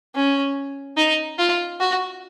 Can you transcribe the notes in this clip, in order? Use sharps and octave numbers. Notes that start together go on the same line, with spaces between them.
C#4
D#4
F4
F#4